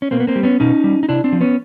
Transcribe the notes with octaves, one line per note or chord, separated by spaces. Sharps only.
C#4
B2 A#3 C4
B3
A#3 C4
G3
B3 C#4
B2 C#4 D#4
G3
D#4
C3 D4 E4
C4 D4
F3
B3 C#4